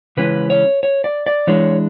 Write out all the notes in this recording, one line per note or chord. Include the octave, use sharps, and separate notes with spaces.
C#3 E3 G#3 C#4 B4
C#5
C#5
D5
D5
E3 G#3 D4 C#5